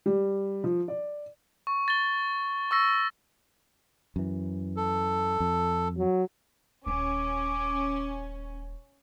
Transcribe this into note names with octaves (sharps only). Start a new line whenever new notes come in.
G3
F3
D5
C#6
A6 G7
C#6 E6 A#6
F#2 E3
A4
F2
F#3
D#1 C#4 D6